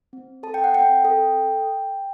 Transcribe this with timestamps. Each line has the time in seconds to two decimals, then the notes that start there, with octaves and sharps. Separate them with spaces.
0.13 C4
0.43 A4 A5
0.54 G5
0.64 F#5
0.74 C4 G5
1.05 A4